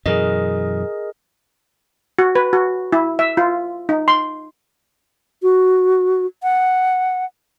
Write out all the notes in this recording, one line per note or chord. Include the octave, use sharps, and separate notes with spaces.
F#2 B2 E3 G#4 A#4 D#5
F#4
B4
F#4
E4
E5
F4
D#4
C6
F#4
F#5